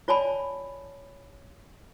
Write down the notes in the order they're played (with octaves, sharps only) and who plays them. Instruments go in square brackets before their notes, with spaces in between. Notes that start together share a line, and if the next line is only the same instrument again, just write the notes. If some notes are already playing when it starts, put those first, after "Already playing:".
[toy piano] F4 C#5 D5 G#5 A5 B5